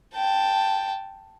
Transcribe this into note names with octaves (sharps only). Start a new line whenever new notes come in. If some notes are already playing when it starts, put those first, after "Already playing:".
G5 A5